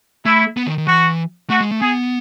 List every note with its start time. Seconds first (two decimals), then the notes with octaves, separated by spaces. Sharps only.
0.25 A3 E4
0.57 B3
0.67 D#3
0.78 D#3
0.87 E3 F#4
1.50 A3 F#4
1.61 G#3
1.71 A3
1.81 B3 G#4